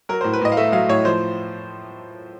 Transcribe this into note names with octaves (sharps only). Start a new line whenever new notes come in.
F#3 A#4
C5
A2
B4
A2 D#5
F5
A3 E5
F#3 F5
A2 C#5
F3 C5